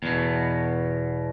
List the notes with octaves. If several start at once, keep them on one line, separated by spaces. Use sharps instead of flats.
E2 B2